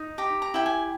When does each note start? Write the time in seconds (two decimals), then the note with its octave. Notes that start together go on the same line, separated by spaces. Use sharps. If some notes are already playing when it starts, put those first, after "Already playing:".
Already playing: D#4
0.18 G4 A#5
0.42 A#5
0.54 E4 G5
0.66 G#5